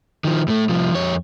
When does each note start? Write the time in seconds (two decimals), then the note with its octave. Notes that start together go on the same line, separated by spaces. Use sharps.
0.24 D#3 F3
0.48 A2 A3
0.69 C2 F3
0.94 F2 C#5